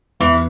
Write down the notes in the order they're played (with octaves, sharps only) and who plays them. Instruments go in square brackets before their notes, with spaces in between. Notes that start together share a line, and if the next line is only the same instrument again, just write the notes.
[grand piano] E2 [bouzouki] E3